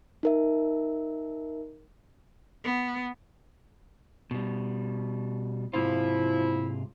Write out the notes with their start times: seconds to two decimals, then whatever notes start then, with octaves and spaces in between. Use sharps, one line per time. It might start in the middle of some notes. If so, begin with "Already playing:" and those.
0.23 D#4 A#4 E5
2.64 B3
4.31 B2 G3
5.74 G#2 C3 F3 E4 F4